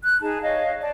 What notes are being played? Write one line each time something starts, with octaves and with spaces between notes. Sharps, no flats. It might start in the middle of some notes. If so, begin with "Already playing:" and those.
F#6
D#4 G#4 A5
C#5 D#5 F5
D5 A5